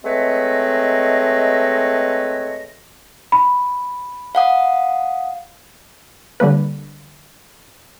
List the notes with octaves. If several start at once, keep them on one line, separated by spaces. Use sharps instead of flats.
G#3 A3 C4 B4 C#5 D#5
B5
F5 F#5 D#6
D3 G3 A#3 B4